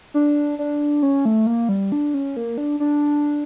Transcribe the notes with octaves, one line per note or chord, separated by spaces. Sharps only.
D4
D4
C#4
A3
A#3
G3
D4
C#4
A#3
D4
D4